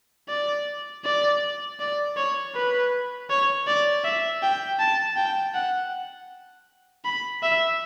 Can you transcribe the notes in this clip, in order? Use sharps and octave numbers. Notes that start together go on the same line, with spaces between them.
D5
D5
D5
C#5
B4
C#5
D5
E5
G5
A5
G5
F#5
B5
E5